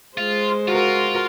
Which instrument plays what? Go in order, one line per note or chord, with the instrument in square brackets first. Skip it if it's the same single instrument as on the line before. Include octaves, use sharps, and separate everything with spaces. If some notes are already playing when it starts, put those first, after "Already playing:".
[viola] G#3 C5 [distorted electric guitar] F4
[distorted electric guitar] F4 [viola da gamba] F#4 A#4